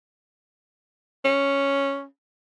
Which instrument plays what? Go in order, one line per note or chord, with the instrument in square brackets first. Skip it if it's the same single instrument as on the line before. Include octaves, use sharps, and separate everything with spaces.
[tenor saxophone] C#4